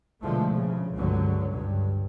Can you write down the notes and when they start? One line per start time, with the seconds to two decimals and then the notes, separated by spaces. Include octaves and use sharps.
0.22 B2 D3 F3 G#3 A3
0.53 C#3
0.96 C#2 G2 D3 F#3
1.53 G2